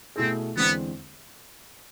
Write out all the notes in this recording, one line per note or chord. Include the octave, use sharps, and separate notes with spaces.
B2 A3 C4 E4 G#4
E2 D3 G#3 B3 C4